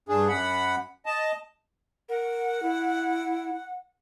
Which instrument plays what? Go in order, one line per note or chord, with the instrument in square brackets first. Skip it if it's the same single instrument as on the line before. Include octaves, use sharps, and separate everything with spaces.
[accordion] G2 D4 G#4
F#2 F#5 B5
D#5 A5
[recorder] A#4 [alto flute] F#5
[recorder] E4